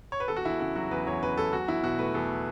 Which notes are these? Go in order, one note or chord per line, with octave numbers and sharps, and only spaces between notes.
C#5
B4
E2 A4
F#4
E2 E4
C#3 E4
F#3 F#4
E2 B4
E2 C#5
C#3 B4
F#3 A4
E2 F#4
E2 E4
B2 F#4
A3 B4
E2 A4